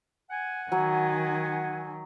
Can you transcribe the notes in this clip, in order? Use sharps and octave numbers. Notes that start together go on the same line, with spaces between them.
F#5 G#5
D#3 F#3